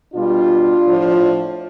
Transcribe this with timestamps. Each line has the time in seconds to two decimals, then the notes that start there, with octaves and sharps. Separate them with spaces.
0.14 B2 G3 D4 F4
0.87 A2 F3